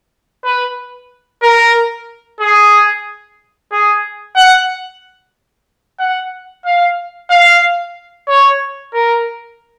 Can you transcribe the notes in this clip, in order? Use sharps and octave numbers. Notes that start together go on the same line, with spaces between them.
B4
A#4
G#4
G#4
F#5
F#5
F5
F5
C#5
A#4